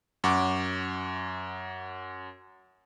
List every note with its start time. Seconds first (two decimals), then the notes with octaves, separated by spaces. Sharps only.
0.24 F#2 F#5 C#6 D6